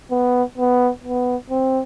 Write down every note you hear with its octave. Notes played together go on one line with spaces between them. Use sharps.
B3
B3
B3
C4